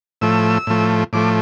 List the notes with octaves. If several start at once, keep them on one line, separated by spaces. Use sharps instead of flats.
A2 F3 A3 E6
A2 F3 A3
A2 F3 A3 D6